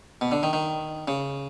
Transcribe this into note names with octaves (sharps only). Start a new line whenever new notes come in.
B2
D3
D#3
D#3
C#3